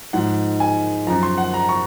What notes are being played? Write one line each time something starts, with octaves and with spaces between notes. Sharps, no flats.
G#2 F3 F#5
G#5
F#2 F3 A#5
C6
F#5
A#5
C#6